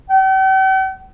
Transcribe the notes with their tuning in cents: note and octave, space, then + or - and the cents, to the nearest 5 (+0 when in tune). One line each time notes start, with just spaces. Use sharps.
G5 -45